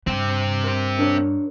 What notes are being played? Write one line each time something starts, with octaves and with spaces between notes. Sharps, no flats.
G2 C4 G4
A#4 C6
D4 A#4 C#5